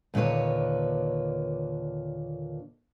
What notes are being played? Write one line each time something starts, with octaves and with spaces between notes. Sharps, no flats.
D#2 A#2 D3 B4 C#5